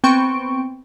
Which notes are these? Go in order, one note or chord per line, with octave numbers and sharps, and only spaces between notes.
B3 C4 G5 C#6 D7